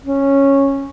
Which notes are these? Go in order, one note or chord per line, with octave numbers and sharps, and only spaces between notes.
C#4